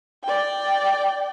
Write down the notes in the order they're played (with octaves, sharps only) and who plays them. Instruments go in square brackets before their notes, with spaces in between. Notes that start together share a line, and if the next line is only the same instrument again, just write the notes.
[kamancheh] D5 G5